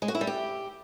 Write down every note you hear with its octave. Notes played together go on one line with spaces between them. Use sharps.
G#3
F#4
E4
G3
G4